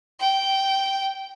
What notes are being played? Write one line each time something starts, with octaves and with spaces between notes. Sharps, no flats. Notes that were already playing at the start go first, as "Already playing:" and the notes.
G5